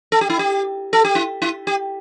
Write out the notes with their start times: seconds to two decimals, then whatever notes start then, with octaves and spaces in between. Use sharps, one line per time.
0.12 A4
0.21 G4
0.30 E4
0.39 G4
0.93 A4
1.05 G4
1.15 E4
1.42 E4
1.67 G4